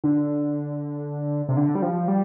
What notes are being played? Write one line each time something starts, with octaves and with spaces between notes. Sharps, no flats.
D3
C3
D3
G3
F3
G3